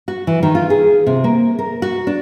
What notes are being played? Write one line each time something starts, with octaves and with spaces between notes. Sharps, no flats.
F#4
E3
D#3
F4
G#4
C3
A#3
A#4
F#4
D4